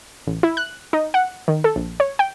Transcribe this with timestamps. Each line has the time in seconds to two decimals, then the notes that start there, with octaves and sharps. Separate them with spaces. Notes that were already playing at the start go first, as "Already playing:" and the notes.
0.27 A1
0.43 E4
0.57 F#6
0.93 D#4
1.14 F#5
1.48 D#3
1.64 A4
1.76 A#1
2.00 C#5
2.19 G5